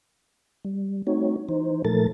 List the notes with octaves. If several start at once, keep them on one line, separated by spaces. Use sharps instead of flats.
G3
A3 C4 D#4 F#4 C#5
E3 D#4 C5
A#2 F3 A3 A4 A#4 A6